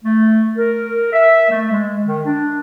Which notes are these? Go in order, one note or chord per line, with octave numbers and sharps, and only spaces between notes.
A3
A#4
E5
A3
G#3
D#3
D4